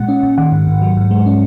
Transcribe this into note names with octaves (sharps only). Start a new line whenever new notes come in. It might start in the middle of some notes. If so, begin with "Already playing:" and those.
Already playing: A#2 G#3 F#5
C#4
A#2
D#3 F#5
G#2
G#2
F#3
G#2
G#3
C#4